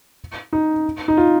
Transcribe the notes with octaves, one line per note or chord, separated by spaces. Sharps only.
D#4
D#4
F4